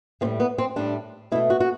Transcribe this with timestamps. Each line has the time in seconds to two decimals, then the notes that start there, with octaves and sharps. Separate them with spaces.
0.21 A2 C4
0.25 G3
0.40 B3
0.58 C4
0.76 A2 G3 D4
1.32 B2 E4
1.35 A3
1.50 F#4
1.60 F#4